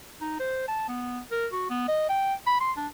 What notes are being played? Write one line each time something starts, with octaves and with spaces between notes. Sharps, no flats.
D#4
C5
A5
B3
A#4
F#4
B3
D#5
G5
B5
C6
D4